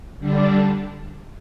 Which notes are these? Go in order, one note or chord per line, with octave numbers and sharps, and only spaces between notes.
D3 G3 D4